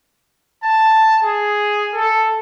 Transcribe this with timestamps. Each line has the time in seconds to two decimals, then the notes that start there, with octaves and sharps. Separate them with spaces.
0.62 A5
1.22 G#4
1.93 A4